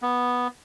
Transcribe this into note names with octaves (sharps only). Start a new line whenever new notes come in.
B3